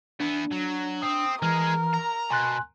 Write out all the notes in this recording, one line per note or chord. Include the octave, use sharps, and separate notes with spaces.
E3 B3 D4
F#3
C4 D#6
E3 G#3 G#4 A#4 F6
A#5
B2 G#5 C6 F#6